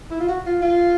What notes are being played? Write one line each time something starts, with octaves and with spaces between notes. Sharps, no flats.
E4
F4
F#4
F4
F4